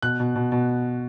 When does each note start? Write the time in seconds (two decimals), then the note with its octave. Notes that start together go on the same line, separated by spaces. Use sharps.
0.02 B2 F#6
0.20 B2
0.36 B2
0.52 B2